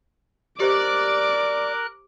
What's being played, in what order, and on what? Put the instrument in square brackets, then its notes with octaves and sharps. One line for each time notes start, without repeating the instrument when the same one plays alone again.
[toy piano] G4 C5 D#5 [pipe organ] A#4 F#6 [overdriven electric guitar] D5 [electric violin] D6